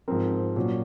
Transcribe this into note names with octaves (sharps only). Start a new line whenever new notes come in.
G#2 F3 C4 A#4
A#2 F#3 C#4